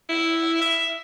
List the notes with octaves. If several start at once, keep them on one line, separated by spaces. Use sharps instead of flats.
E4
E5